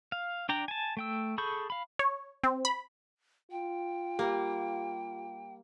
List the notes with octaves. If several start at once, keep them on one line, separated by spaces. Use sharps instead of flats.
F5
D4 D5 G5 A#5
G#5 A5
A3 G5 E6
G#4 A4 B5 C#6 G6
F5 B5
C#5
C4
B5
F4 G5
G3 A#3 G4